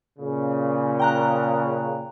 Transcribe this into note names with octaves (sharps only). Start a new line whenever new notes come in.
A#2 C#3
G5 A#5 F#6